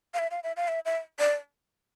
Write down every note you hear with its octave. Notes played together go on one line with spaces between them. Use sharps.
F5
E5
F5
E5
F5
E5
E5
D5